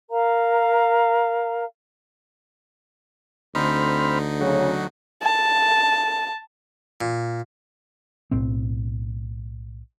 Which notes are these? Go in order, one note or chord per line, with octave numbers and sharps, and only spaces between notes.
A#4 F5 A#5
D2 D3 C4 D#4 B5 F6
C#3 F#3
A5
A#2
B1 A2 C4